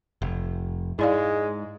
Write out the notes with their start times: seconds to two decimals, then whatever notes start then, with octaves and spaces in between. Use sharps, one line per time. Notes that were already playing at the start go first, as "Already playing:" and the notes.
0.22 F1
0.99 G#2 G#3 E4 D5 F5